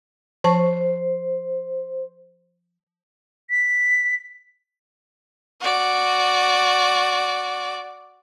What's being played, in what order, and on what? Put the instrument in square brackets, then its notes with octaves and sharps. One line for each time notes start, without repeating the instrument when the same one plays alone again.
[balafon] F3 A5 C#6 [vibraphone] C5
[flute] B6
[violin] F#4 D5